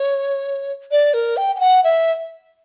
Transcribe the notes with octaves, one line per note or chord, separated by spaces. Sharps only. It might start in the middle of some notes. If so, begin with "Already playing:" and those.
Already playing: C#5
D5
A#4
G5
G5
F#5
E5